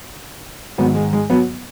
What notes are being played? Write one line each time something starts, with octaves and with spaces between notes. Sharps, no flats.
G#2 D#3 F#3 B3
G#3
G#3
F#3 B3